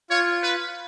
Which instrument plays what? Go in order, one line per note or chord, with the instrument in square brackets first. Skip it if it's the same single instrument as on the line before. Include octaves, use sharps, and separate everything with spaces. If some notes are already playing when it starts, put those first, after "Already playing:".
[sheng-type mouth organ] F4 [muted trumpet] C#5
[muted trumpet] B4